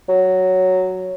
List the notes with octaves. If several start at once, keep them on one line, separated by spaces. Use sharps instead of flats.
F#3